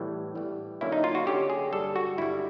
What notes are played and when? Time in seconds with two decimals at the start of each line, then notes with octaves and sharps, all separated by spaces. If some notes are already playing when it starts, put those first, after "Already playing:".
Already playing: A2 E3 G3 B3
0.35 A2 E3 G3 B3
0.81 D3 F#3 A#3 C#4 E4
0.92 D#4
1.04 F4
1.15 F#4
1.27 D3 F#3 A#3 C#4 G4
1.50 G#4
1.72 G2 D3 G3 A4
1.96 F#4
2.18 G2 D3 G3 E4